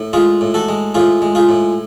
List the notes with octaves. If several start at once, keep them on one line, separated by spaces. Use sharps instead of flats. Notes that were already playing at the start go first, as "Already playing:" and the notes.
Already playing: A2
G#3 F4 G#4
A2
F#4 A4
G#3
A2 F4 G#4
G#3
F4 G#4
A2